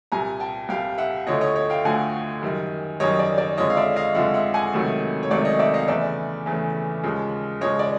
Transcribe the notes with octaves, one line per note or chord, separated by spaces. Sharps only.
C2 A#2 G3 G#5 A#5
G5 A5
C2 A#2 G3 F5 G5
E5 F#5
D2 D3 F3 A3 C#5 D#5
C#5 D#5
C#5
F5 G5
D2 D3 F3 A3 F#5 G#5
F#2 D#3 G3
F#2 D#3 G3 C#5 D#5
D5
D5
F2 D3 F3 G#3 C#5 D#5
F5
D5 E5
D#5 F5
F2 D3 F3 G#3 E5 F#5
E5 F#5
F#5 G#5
C#2 C3 D#3 F#3 A3
C#5
C#2 C3 D#3 F#3 A3 D5
C#5 D#5
D5 E5
D#5 F5
E2 C#3 E3 A3 D5 E5
E2 C#3 E3 A3
D#2 C#3 F3 G#3
D#2 C#3 F3 G#3 C#5 D#5
D5